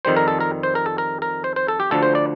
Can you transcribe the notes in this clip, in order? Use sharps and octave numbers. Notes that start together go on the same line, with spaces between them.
F2 D#3 G3 C5
A#4
A4
A#4
C5
A#4
A4
A#4
A#4
C5
C5
A4
G4
D2 D3 F3 A4
C5
D5